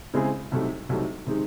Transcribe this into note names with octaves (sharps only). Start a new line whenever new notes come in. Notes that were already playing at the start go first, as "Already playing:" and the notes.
C#3 G#3 C4 E4 G#4
C2 C3 F#3 A3 D#4
C2 C3 F#3 A3 D#4
C3 D#3 G#3 D#4